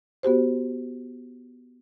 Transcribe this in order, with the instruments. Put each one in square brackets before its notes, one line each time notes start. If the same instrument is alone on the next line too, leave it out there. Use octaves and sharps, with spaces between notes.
[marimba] B3 F#4 G4 C5